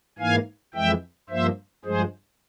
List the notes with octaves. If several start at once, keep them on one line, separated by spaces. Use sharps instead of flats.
G#2 E3 A#3 F5 G#5
F2 E3 G#3 E5 G5
G2 F3 A#3 C5 E5
G2 F3 G#3 G#4 C5